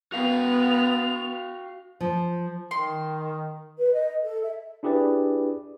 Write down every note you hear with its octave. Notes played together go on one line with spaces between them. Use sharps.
B3 F#4 F5 G5 F7
F3
D#3 C6
B4
D#5
A4
E5
D4 E4 G4 G#4 B4 D5